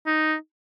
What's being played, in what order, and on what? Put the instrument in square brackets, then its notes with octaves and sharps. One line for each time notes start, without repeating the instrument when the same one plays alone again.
[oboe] D#4